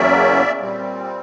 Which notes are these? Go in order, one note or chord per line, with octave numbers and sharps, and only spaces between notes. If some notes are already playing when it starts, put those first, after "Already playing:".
Already playing: E2 C#3 F#3 A#3 C#4 D5 E5
A#2 G3 C4